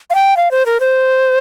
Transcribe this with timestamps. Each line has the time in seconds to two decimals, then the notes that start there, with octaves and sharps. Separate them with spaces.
0.10 F5
0.15 G5
0.37 F5
0.51 C5
0.66 A#4
0.80 C5